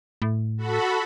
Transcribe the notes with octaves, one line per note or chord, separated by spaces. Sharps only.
A2
F#4 A4 B5